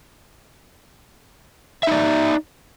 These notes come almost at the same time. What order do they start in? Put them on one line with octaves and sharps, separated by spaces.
E5 D#4 D5